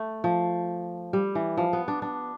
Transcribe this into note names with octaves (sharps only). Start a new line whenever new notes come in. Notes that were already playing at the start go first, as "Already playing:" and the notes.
Already playing: A3
F3
G3
E3
F3
B3
D4
D4